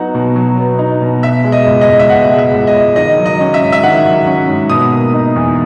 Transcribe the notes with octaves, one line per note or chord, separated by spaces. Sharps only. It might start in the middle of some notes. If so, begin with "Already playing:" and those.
Already playing: F#3 B3 D#4 F#5
B2
F#3
B3
D#4
B2
B2 E5
G#3
D#5
C#2
D#5
C#2
E5
B2 F#5
G#3
E5
C#2
D#5
C#2
D#3 D#5
F#3
D#5
C#4
E5
G#2
E5
D#3 F#5
F#3
C#4
G#2
B2 D#6
A#3
D#4
E2